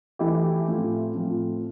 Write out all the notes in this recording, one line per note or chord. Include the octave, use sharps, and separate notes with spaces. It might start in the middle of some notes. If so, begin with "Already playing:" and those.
E3 A3 E4 G4
A2 F3 A3 C4 F4
A2 F3 A3 C4 F4